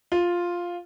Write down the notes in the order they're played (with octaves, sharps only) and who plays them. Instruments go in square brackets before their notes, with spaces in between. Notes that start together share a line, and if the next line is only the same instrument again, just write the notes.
[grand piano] F4